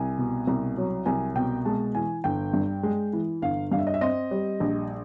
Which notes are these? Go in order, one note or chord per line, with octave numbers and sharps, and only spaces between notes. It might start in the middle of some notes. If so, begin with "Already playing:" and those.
Already playing: C2 G#5
B2
C2
F#3
C2 G#5
B2 G5
G#3 A5
E3 G#5
G1 G5
G2
G#3
E3
G1 F5
G2 F5
E5
D#5
E5
C4 D#5
G3
A#1